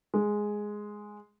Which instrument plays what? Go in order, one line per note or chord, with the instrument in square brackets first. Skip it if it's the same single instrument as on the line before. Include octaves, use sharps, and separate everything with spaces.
[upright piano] G#3